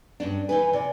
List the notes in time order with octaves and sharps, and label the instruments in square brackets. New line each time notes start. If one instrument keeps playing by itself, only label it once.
[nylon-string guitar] G2 C#4 D4
[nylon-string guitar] E3 D#4 B4 [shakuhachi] G#5
[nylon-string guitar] C3 [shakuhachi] D5